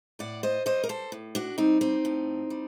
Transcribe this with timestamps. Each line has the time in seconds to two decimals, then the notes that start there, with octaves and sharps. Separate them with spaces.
0.19 A2 D5 F#5
0.43 C5 D#5
0.66 G3 C5 D#5
0.84 A#4
0.89 A4 C5
1.12 A2
1.35 D4 F#4
1.58 G3 C4 D#4
1.81 C4 D#4
2.05 A2
2.50 G3